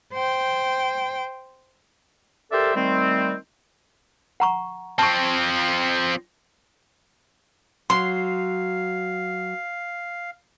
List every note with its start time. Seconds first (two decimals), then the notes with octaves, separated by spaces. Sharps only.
0.14 C5 G5
2.51 G4 A4 A#4 C5 D5 E5
2.75 D#3 G3 A3 C4
4.40 F#5 A#5 C#6
4.99 F3 C4 A5 C#6
7.90 F#3 F5 C6